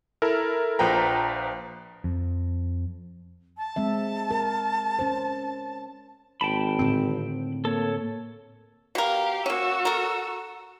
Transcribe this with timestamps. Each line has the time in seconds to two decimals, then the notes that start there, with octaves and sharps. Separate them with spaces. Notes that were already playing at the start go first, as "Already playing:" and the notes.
0.22 E4 A4 A#4
0.79 A#1 F3 B4 G5 A#5
2.04 F2
3.57 A5
3.76 G#3 C4 E5
4.31 A#4
4.99 C#4 C5
6.41 G#1 G5 A5 B5
6.79 A2 D3 C4
7.65 A#3 A4 C#5
8.95 B2 G4 A#4 F5
9.46 A#3 C#4 F#4 E6
9.85 A4 A#4